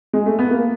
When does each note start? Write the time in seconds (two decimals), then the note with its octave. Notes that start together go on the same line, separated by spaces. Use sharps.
0.13 G#3
0.26 A3
0.39 B3
0.51 A#3